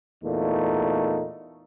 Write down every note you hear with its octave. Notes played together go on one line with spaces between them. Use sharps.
E2 A#2 A3 D#4